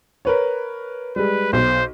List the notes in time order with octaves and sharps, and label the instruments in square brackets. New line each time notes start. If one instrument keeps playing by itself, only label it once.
[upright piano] A#4 B4 C#5
[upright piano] G3 G#3 [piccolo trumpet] B4
[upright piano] B1 [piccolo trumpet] C5